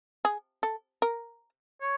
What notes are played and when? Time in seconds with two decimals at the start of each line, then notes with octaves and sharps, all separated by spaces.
0.25 G#4
0.63 A4
1.02 A#4
1.81 C#5